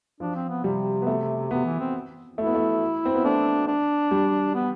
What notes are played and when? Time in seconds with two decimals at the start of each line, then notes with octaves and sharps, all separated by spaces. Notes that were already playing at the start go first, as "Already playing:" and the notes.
0.20 F3 D4
0.35 C4
0.49 B3
0.64 C3 G3
1.02 B3
1.07 A3
1.51 C3 B3
1.65 E3
1.79 C4
2.37 A3 E4
2.46 B3
2.55 A3
3.05 C4
3.14 B3
3.24 A3 D4
3.68 D4
4.11 G3
4.55 B3